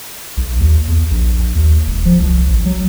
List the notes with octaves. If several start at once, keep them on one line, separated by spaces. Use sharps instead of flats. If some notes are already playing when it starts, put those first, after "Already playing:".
B1
D#2
E2
A#1
D#2
E1
F3
C2
A1
F#3